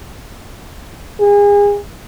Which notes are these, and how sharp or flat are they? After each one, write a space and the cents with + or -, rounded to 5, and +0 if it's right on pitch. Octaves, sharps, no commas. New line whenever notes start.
G#4 -30